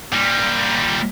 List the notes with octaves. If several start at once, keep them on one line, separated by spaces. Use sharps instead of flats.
A#2 G3